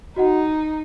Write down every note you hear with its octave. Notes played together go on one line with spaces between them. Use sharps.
D#4 F#4 D#5 F#5